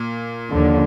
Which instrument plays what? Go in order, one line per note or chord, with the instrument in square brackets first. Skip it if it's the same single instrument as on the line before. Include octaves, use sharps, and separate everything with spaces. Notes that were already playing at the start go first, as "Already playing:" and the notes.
Already playing: [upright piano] A#2
[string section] D#2 D3 F3